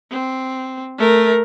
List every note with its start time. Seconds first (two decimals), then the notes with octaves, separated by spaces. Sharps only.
0.11 C4
0.99 A3 A#4